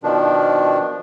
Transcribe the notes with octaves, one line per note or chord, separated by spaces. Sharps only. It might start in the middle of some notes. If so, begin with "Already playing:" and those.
B2 D#3 F3 D4